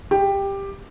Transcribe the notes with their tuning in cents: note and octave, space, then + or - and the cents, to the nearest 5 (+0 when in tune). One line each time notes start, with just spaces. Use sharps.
G4 +10